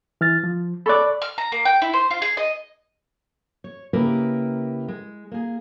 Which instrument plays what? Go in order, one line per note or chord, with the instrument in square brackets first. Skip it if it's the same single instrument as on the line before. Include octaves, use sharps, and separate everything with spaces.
[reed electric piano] E3 F6 A6
F3
[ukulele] A4 D5 [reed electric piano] B5 C#6 F#6
[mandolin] F6
A#5
A#3
G5
E4
C5
F4
G#4
D#5
[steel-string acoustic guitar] C#5
C#3 A#3 E4 G4 A#4 B4
G#3
A#3 G#4